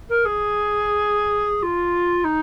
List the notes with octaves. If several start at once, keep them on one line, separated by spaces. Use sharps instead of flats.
A#4
G#4
F4
D#4